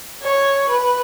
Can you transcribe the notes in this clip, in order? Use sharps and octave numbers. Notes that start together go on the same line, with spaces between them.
C#5
B4